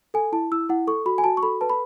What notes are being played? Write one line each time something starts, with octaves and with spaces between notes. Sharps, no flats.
A4 G#5
E4 A5
E4 E6
E4 F#5
A4 C#6
F#4 B5
G#5
F#4 A5
C#6
A4 B5
B4 A5
B5